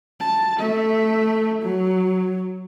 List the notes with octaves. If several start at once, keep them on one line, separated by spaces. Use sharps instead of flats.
A5
A3 E5
F#3